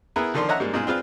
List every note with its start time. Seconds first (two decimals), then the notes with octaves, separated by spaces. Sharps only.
0.16 B3 E4 G#4 A#4 B4
0.34 D3 D#3 F3 A4 D5 C6
0.49 C#5 D#5 E5 F#5 A#5
0.60 G#2 G3 A#3 G#4
0.74 G#2 B2 F4 G#4
0.87 C4 D4 F4 G#4 B4 F5